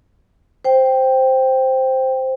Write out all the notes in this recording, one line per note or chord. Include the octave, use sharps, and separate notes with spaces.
C5 G5